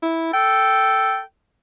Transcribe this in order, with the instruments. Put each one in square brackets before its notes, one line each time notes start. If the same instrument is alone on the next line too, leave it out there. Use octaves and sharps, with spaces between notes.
[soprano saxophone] E4
[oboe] A4 [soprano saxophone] G5